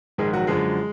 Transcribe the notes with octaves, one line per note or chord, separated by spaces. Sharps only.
A#1 G#2 D#3 G#3 G#4
F#3 F#4
F#2 D3 F3 G#3 G#4